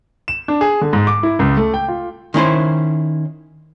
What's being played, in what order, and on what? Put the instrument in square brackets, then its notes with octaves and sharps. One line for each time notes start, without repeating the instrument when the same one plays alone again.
[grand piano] E7
D4
G#4
D3
G#2
D6
E4
C#2
A3
G5
F4
[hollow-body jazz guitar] D#3 C#4 E4 C5